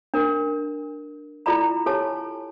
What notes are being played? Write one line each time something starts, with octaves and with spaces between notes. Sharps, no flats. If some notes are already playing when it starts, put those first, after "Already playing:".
D4 A#4
E4 F4 A4 D5 A#5 B5
G4 A4 C#5 G#5 A5